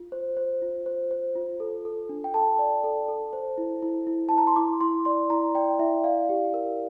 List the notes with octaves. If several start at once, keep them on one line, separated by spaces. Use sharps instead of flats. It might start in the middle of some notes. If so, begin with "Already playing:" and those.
Already playing: F4
C5
C5
F4
C5
C5
F4
A4
A4
D4
G5
A4 A5
D5
A4
A4
C5
E4
E4
E4
E4 A5
A#5
C6
E4 D6
E4 C6
D5 C6
E4 A#5
D5 G5
E4 E5
D5 F5
G4
A#4